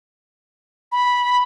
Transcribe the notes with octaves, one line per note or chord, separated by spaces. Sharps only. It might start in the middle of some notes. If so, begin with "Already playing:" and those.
B5